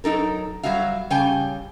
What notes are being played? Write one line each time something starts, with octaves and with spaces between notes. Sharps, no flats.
F#3 D#4 A4 A#4
F#3 G3 F#4 E5 F5
C#3 G3 G5 G#5